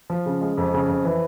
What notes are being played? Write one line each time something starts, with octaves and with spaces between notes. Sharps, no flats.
F3
C#3
G#3
F2
C#3
F2
E3